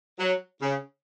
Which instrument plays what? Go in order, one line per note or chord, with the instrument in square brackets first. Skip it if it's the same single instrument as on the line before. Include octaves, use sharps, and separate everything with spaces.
[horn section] F#3
C#3